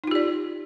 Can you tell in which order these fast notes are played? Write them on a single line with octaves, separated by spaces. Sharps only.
D#4 F4 G4 D5